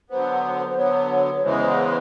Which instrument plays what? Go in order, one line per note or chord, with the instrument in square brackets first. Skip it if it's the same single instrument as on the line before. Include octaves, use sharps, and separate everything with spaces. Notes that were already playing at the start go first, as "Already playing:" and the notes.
[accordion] D3 F#3 B3 [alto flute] C5
[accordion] D3 F#3 B3 [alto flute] C#5
[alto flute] C#5
[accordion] E2 C#3 E3 G#3 [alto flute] C5
[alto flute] C5
B4